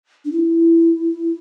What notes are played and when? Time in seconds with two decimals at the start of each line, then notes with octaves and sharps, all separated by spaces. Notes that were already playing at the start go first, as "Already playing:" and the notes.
0.25 D4
0.32 E4